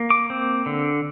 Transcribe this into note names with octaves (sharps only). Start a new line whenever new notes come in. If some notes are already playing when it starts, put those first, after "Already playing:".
Already playing: A#3
D6
C4
D3